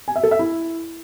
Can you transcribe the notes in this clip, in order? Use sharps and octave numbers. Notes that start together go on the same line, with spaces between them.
G#5
E5
A4
E5
E4